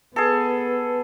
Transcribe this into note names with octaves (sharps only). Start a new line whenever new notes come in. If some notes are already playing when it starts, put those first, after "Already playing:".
B3 G#4 A4 B4